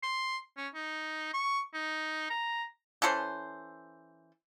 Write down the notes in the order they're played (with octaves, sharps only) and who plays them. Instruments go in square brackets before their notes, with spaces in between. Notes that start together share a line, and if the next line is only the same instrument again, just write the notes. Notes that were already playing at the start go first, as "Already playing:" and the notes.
[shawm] C6
C#4
D#4
C#6
D#4
A#5
[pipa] E3 C#4 A4 C5